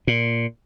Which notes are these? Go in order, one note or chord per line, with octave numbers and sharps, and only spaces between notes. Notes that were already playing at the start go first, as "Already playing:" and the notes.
A#2